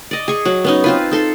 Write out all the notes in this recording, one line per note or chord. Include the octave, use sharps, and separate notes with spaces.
D5 D#5
G#4 C#6
F#3 F#5
B3 C#4 D#4
C4 F4 B4
D#4 A4 C6